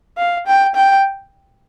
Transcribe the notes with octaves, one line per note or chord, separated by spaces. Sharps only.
F5
G5
G5